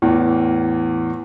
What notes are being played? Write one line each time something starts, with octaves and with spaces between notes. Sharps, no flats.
E2 A2 E3